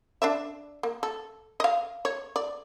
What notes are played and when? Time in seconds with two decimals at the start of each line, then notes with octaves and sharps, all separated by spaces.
0.22 D4 D5 E5
0.83 A#3
1.03 A4
1.60 D#5 F5
2.05 C#5
2.36 D5